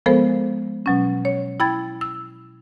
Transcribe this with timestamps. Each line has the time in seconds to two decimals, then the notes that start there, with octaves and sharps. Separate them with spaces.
0.06 F3 G#3 B3 A4 A#4 C5
0.86 B2 F#3 C#4
1.25 C#5
1.60 E4 G5 B5 G#6 A6
2.01 E6